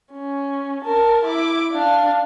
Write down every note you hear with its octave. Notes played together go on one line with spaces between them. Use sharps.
C#4
A#4 A5
E4 D6
D4 F5